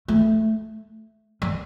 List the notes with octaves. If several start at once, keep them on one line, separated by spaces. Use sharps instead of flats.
A3
G3